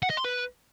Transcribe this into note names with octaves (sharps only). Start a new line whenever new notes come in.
F#5
D#5
C6
B4